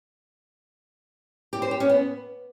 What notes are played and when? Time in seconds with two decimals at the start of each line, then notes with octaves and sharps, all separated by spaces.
1.53 G4
1.62 C5
1.71 G4
1.80 C#4
1.89 B3